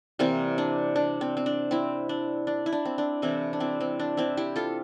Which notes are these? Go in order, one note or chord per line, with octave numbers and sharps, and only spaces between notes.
C3 E3 G3 A#3 C4
D4
D4
C4
C4
D4
C4 E4
D4
D4
E4
D4
C4
D4
C3 E3 A3 C4 E4
D4
C4 E4
C4
D4
C4 E4
E4 G4
F4 A4